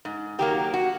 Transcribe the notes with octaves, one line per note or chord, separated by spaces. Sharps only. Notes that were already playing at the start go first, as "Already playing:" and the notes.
G#2
D#3 F#3 A#3 G4
F#4